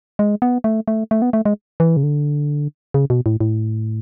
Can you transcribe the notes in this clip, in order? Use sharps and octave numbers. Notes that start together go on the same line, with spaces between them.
G#3
B3
A3
A3
A3
B3
A3
G#3
E3
C#3
D3
C#3
B2
A2
A2